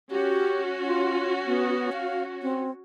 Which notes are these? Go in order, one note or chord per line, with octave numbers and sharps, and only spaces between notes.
C#4 F#4 G4
F4
B3
F5
C4